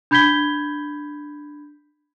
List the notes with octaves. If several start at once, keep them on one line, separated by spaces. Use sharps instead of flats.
D4 B5 G6 G#6 B6 G7